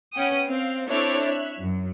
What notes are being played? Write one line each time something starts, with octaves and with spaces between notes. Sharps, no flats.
B3 C#4 F#5 G5 D#6
C4 F5
C4 D4 E4 A4 C#5 D5
C#5 E5 F#6
F#2